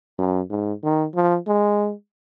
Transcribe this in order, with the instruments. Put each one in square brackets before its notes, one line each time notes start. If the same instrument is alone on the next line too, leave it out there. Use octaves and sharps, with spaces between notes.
[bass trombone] F#2
G#2
D#3
F3
G#3